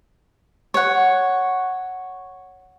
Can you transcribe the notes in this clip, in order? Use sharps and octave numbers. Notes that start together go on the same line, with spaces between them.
C#5 F#5